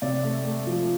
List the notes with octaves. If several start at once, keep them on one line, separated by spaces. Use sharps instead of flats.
C3 D5
A3
A3
F3